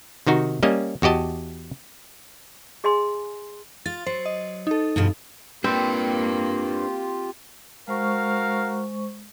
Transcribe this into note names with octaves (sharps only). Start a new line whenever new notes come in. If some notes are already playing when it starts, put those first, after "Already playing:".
C3 D#3 D#4 F#4
G3 A#3 C#4 D#5
E2 F#4 G4 D#5 A5
G#4 D#5 G#5 C6
F4 A6
F#3 C5
D#5
D#4 A4
G2 B2 F3
A#3 C4 D4 F4 G4 B4
G#3 F#4 A#4 C5 F5 C#6